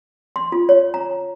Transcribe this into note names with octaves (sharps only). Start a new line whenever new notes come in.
C6
F4
C#5
A#5